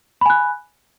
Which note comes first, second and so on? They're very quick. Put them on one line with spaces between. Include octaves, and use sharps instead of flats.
B5 G#5 F#6